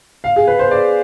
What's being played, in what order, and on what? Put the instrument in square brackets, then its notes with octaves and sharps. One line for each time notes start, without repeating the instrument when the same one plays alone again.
[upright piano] F5
G#4
B4
C5
D5